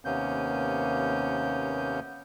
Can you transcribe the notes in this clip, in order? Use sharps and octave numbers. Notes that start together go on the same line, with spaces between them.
D#2 C3 A#3 B3 C#4 G6